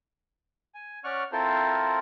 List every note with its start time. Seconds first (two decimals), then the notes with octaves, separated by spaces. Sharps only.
0.74 G#5
1.04 C#4 D5 F#5 C#6 F6
1.32 C4 E4 F4 A4 A#4 C5